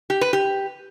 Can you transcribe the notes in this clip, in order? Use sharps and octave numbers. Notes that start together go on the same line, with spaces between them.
G4
B4
G4